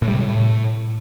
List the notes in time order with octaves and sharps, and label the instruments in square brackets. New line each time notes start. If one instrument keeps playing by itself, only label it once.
[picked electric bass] A2
G3
C3
A2